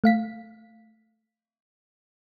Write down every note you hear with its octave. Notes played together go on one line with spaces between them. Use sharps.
A3 F5 B6